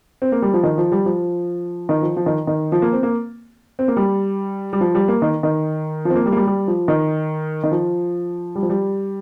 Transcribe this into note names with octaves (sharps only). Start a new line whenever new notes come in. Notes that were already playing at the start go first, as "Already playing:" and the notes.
C4
A#3
G3
F3
D#3
F3
G3
F3
D#3
F3
F3
D#3
D#3
F3
A#3
C4
A#3
C4
A#3
G3
G3
F3
G3
A#3
D#3
D#3
F3 C4
A#3
G3
A#3
G3
G3
F3
D#3
D#3
F3
G3
F3
G3